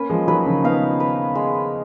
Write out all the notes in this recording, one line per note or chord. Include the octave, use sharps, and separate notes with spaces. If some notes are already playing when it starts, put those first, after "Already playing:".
Already playing: A#3 C#4 B4
F3 G#3
D#3 F#3 B4
C#3 F3
B3 D#4 F5
B4
G#3